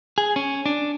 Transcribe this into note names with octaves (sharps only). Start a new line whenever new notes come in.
G#4
C#4
D4